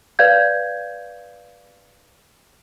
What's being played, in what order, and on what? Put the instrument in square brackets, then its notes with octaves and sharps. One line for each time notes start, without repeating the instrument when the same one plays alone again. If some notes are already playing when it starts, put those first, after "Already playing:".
[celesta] B4 D5 F5 G6 G#6